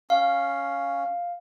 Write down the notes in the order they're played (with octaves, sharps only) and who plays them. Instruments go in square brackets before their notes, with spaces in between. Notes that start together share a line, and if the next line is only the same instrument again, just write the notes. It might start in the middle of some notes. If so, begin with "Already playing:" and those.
[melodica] C#4 [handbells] F5